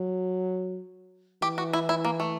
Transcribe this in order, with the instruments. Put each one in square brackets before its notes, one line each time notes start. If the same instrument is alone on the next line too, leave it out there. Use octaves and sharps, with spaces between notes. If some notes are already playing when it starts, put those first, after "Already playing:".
Already playing: [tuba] F#3
[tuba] E3 [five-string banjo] G4
[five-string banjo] F#4
E4
E4
A#3
A3